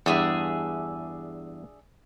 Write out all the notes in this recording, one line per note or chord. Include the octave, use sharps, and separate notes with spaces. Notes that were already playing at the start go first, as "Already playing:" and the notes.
E2 G2 D4 G#4 E5